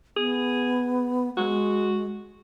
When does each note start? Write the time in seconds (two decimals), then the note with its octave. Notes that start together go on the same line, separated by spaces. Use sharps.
0.17 B3 G#4
1.37 G#3 F#4